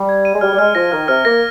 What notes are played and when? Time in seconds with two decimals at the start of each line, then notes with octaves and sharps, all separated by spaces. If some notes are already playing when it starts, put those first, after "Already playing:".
Already playing: G3
0.09 G#6
0.25 D#7
0.35 G#3
0.41 G3 F6
0.53 G3
0.58 G#3 F6
0.75 F3 A#6
0.92 D#3 F6
1.08 C3 F6
1.25 A#3 A#6